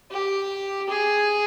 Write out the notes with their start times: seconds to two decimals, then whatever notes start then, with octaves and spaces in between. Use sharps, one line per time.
0.11 G4
0.89 G#4